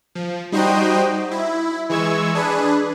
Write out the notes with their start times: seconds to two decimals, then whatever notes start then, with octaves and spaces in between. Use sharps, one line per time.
0.15 F3
0.52 G3 D#4 F#4 C5 D#5 G5
1.31 E4
1.90 E3 G#3 C#6 E6 G#6
2.35 D4 G#4 B4